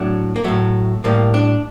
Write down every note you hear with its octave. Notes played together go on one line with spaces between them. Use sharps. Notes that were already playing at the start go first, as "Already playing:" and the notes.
Already playing: A2 F#3 D4
A#3
A2 F#3 A3
A2 G3 A#3
D4